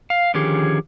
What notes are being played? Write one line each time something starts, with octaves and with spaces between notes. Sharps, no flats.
F5
D3 D#3 F3 C#4 G4 G#4